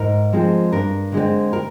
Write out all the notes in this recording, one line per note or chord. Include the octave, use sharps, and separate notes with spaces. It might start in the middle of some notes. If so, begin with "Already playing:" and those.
Already playing: G#2 A#4
F3 G#3 C4
G2 A#4
D3 G#3 C4
A#4